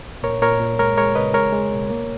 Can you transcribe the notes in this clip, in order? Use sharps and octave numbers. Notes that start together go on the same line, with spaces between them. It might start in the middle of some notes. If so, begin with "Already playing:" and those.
A#2 A#4 C#5
A#2 A#4 C#5
A#2
G#3 A#4 C#5
G#3 A#4 C#5
C#3 B4 D#5
G#3 A#4 C#5
G#3
B2
A#3